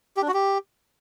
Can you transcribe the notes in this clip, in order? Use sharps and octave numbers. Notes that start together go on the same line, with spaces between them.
G4
D4
F#4
G4